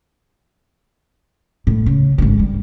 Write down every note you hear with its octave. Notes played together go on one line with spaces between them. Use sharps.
A2
C#3
G#1 D3
G3